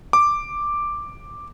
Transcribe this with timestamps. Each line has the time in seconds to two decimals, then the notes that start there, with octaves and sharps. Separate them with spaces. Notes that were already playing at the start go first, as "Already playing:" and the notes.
0.13 D6